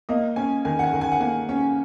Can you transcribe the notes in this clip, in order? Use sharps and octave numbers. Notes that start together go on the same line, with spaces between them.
A#3 D#5
C#4 G#5
D#3 G#5
F#5
G#5
D#3 F#5
G#5
F#5
A#3 G#5
C#4